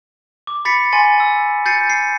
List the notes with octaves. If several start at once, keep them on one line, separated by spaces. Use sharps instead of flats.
D6
B5 A6 B6 C#7
G#5 C6 A6 D#7
E6
G6 A6 C7 C#7 D#7
C7